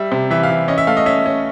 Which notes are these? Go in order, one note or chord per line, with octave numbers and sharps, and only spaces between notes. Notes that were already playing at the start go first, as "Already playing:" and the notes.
Already playing: G3 E5
C3
E3 E5
F5
E3
C#4 D#5
E5
A3 F5
D#5
C#4 E5
C#4